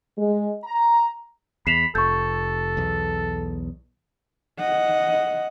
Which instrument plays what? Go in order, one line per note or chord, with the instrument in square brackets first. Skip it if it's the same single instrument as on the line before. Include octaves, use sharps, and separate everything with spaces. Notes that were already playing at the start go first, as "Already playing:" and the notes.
[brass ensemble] G#3
A#5
[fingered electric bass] E2 [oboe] B5 [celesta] C7 E7 F7
[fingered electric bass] F1 [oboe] A4 [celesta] C#6 G6
[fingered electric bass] B1 E2
[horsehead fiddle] D#5 F#5